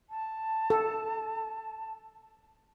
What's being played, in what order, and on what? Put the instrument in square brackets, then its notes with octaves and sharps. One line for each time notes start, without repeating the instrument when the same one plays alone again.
[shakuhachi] A5
[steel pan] A4